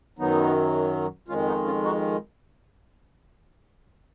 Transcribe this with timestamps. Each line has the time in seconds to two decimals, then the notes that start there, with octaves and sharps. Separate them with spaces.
0.19 F#2 D#3 F#3 B3 D#4
1.28 F2 D#3 G#3 C#4 F4
1.47 B3 D#4
1.65 C#4 F4
1.83 D#4 F#4